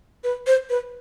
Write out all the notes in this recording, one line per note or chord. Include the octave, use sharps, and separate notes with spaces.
B4
C5
B4